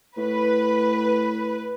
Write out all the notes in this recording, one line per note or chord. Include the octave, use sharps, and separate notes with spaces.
A2 B4